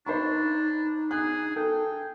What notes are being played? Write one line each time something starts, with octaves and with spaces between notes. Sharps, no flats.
D4 D#4 C5 B5 C#6
G#4 F#6
A4 G5